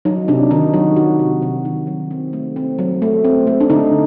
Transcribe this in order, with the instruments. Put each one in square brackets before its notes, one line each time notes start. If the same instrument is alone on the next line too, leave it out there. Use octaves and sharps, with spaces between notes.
[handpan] F#3 D#4
C3 D4
D#3 D#4
F#3 F#4
D#3 F#4
C3
C3
D#3
F#3
C4
A3
C4
F#3
A3
C4
A3
D4
D3 D#4